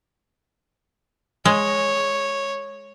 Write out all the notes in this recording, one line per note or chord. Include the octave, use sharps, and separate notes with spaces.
G#3 C#5